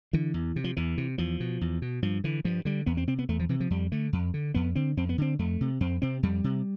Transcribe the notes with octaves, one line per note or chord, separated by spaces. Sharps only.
D3 E3
E2
C3
F3
E2 E3
C3
E2 F3
B2
E2
B2
G2 F3
D3 E3
G2 F3
D3 G3
E2 B3
C4
C3 C4
B3
E2 A3
F3
C3 E3
F3
F2 G3
D3 A3
F2
D3
F2 B3
D3 C4
F2 C4
B3
D3 C4
F2 A3
C3
F2 C4
C3 C4
F2 G3
C3